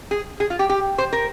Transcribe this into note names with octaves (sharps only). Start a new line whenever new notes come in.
G#4
G#4
F4
G4
G4
C5
A#4